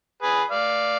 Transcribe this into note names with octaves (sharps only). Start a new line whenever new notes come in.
G#4 B4
D5 F5